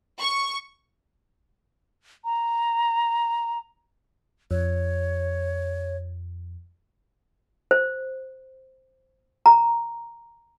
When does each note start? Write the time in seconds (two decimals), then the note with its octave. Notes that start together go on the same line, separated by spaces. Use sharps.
0.20 C#6
2.25 A#5
4.51 F2 C#5
7.71 C5
9.46 A#5